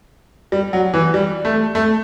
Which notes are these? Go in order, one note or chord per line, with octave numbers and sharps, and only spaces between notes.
G3
F#3
E3
G3
A3
A3